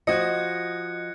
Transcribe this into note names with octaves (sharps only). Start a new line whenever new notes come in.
F3 F#4 D#5 F#6 G#6 C#7